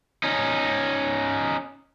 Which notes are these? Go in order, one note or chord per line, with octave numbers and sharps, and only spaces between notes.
C#4 D#4